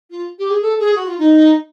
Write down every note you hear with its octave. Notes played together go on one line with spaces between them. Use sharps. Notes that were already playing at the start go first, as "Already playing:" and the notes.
F4
G4
G#4
A4
G#4
F#4
F4
D#4